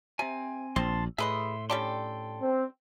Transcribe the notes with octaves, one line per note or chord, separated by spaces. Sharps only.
C3 C4 G#5
A#1 C4 A5 C6
A2 G#4 B4 D#5 E5 C6
G3 C#4 D4 A4 G5 C6
C4